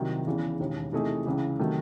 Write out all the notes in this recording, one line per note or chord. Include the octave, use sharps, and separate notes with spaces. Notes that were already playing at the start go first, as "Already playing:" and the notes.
Already playing: C2 C3 D#3 F#3
E2 C#3 E3
E1 D#2 C#3
C3 E3 A3 D#4 G#4
C#2 C#3 E3
C3 D#3 F#3 A3